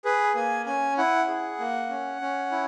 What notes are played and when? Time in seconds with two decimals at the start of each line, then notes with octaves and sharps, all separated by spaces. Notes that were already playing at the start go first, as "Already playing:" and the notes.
0.05 G#4 B4
0.35 A#3 G#5
0.66 C#4 G#5
0.98 E4 F#5
1.28 G#4
1.59 A#3
1.89 C#4
2.21 C#4
2.52 E4